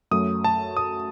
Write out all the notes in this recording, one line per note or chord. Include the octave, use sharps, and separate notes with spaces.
F#2 F#3 A3 D#6
A5
D#6